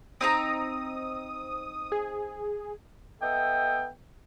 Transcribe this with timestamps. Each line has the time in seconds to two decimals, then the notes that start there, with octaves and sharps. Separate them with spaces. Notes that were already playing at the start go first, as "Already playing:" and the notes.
0.21 C4 D#4 A#5 D#6
1.92 G#4
3.21 B3 A4 D#5 E5 G5